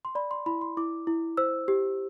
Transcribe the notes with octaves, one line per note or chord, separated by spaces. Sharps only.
C6
D5 B5
C6
E4 B5
C6
E4 D6
E4
C5 E6
G4